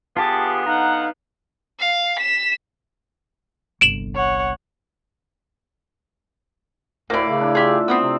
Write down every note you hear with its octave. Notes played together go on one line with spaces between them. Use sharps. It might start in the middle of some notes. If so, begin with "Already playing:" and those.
D3 B3 F4 G4 G#4 A5
D#4 F5 F#5 A#5
F5
B6 E7
G1 C2 D7 E7 F#7
C#5 F#5
D2 A2 A#3 E4 D5
C#3
D4
F4 G4 G#4 E5
B3 C4 D#6 E6
C3